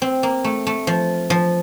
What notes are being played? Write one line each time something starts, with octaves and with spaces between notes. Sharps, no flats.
C4
A#3
A3
A3
F3
F3